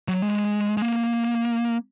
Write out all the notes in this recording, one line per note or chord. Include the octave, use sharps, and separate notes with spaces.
F#3
G#3
G#3
A#3